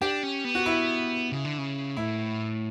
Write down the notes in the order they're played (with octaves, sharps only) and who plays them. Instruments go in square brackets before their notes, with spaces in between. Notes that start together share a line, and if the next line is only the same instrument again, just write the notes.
[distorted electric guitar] D4 [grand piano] G4
[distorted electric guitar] C#4
B3
[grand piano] F#4
E4
[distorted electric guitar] C#3
D3
C#3
[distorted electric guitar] A2 [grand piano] E4